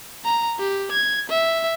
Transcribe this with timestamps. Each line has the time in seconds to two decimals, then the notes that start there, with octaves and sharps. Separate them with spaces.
0.25 A#5
0.59 G4
0.92 G#6
1.30 E5